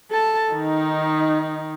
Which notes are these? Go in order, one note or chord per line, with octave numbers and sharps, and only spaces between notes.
A4 A5
D#3 D#4